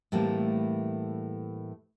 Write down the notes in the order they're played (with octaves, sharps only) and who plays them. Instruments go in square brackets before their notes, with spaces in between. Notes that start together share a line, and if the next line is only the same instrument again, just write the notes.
[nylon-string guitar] A2 E3 G3 A3 A#3 C4